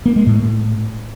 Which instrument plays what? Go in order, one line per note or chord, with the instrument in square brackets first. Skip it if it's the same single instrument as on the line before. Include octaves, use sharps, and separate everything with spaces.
[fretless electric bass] A#3
G#3
A2